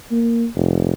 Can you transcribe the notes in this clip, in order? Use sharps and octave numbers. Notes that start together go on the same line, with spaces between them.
A#3
F1